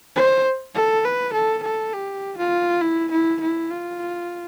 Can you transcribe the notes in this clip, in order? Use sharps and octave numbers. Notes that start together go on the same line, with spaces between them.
C5
A4
B4
A4
A4
G4
F4
E4
E4
E4
F4